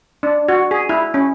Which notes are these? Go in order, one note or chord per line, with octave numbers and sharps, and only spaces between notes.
D4
F#4
G#4
E4
C#4